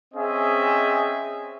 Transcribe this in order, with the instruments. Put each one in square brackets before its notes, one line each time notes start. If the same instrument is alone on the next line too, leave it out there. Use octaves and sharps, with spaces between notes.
[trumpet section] C4 C#4 G#4 D#5 E5